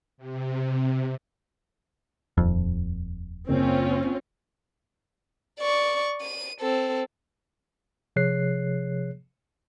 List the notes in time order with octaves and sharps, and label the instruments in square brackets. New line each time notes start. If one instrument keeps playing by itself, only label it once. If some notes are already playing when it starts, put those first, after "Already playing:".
[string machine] C3
[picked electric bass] D#1 F2
[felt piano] F#1 [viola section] C4 C#4 F4
[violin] D5 C#6
D#7
C4 A4
[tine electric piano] C3 F3 G#4 C#5 F#6 C7